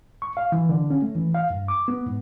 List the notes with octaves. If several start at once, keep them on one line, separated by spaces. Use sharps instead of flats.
C#6
F5
E3
D3
C#4
A3
E3
F5
G2
D6
B3
G#2